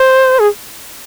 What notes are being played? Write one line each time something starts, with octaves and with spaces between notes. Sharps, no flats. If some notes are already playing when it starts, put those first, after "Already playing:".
Already playing: C5
G#4